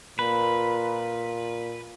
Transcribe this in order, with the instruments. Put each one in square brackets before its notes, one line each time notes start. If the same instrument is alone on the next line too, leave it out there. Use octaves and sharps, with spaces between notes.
[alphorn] A#2 [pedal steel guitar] B4